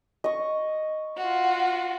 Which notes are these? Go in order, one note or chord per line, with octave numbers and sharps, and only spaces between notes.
D#5 C#6
F4 F#4